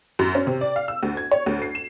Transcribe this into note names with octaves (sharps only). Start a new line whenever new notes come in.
F#2
C#4
C3
D5
F5
E6
D2
G#6
C#5
D2
C7
E7